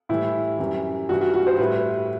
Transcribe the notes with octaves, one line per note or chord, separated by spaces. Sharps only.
A2 E3 G3 E4
F#2 E3 G3
G2 E3 G3 F#4
F#4
F#4
C5
A2 G3 B4